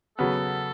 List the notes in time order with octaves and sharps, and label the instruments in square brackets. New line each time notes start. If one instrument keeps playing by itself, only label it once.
[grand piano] C#3 F#3 B3 [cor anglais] A4